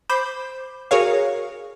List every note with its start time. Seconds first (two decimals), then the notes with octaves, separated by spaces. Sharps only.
0.09 C5 B5 D6 G6
0.91 F#4 G#4 A#4 C#5 F5